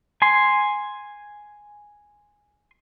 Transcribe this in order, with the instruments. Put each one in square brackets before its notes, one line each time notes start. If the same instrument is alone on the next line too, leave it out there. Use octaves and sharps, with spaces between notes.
[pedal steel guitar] G#5 C6